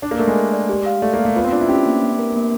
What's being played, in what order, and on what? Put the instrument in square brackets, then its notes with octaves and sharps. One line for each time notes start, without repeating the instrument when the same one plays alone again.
[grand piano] D4 [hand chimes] D5
[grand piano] A#3
[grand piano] A3 [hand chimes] A#4
[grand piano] G#3
[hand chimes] A#4
D5
G4
F5
[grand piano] A3 [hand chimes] D5
[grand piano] A#3
[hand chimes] F5
[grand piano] A3
[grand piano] B3 [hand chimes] F4
[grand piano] C4
[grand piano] D4 [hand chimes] F4
[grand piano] E4
[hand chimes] C#4 [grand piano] G4
[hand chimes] A#3
A#3
A#4
A#3